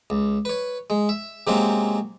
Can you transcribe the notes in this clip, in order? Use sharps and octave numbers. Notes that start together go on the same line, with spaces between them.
C#2
B4 C#5
G#3
E5
C3 F#3 G#3 A#3 C4 C#4